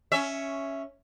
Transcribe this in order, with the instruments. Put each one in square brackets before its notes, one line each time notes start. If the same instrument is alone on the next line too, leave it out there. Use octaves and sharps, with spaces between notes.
[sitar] C#4 E5